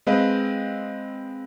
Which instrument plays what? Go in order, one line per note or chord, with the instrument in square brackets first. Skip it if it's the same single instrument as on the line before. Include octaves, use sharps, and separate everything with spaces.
[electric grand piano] G#3 C4 B4 D#5 F5